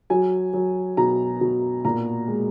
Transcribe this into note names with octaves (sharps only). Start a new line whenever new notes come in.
F#3 G#5
F#3
B2 A#5
B2
A#2 A#5
G#3